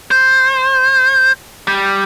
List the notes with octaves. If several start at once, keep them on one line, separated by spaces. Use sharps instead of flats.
C5
G3